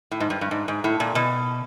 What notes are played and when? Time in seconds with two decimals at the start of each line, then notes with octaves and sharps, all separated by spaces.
0.11 A2
0.20 G#2
0.30 G2
0.41 G2
0.51 G#2
0.68 G#2
0.84 A2
1.00 A#2
1.15 B2